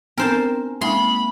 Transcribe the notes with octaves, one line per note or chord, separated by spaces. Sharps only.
B3 C4 D4 A#4 C5 A5
G#3 A#3 C4 B5 C6